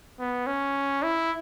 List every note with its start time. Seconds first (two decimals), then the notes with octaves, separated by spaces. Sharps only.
0.20 B3
0.47 C#4
1.03 E4